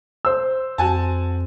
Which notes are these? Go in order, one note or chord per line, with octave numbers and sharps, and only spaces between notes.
C5 E6
F2 F#4 G#5 A5